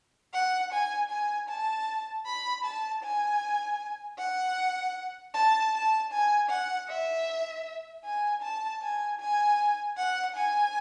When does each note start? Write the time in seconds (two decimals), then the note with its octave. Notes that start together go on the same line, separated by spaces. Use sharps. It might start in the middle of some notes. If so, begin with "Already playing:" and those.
0.33 F#5
0.72 G#5
1.11 G#5
1.49 A5
2.26 B5
2.64 A5
3.03 G#5
4.19 F#5
5.34 A5
5.74 A5
6.12 G#5
6.50 F#5
6.89 E5
8.05 G#5
8.42 A5
8.82 G#5
9.20 G#5
9.97 F#5
10.36 G#5